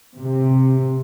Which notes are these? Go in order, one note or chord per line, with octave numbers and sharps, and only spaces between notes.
C3